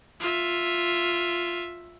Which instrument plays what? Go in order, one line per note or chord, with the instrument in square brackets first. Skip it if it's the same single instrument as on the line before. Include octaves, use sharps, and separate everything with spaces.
[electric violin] F4 E5